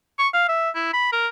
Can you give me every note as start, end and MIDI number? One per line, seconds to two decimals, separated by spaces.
0.19 0.28 85
0.34 0.46 77
0.49 0.70 76
0.75 0.89 64
0.94 1.11 83
1.13 1.28 70